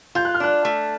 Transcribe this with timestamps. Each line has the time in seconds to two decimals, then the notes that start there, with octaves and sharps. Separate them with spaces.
0.15 F4 G6
0.25 F#6
0.34 F6
0.40 D4 F#6
0.65 A3